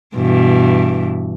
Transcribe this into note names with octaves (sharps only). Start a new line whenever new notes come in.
G2 B2 E3